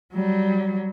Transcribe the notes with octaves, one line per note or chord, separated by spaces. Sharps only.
F#3 G3